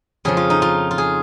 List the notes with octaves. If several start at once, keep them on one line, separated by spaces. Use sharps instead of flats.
F2 C#3 F3 G#4
F4
D#4
F4
F4
G#4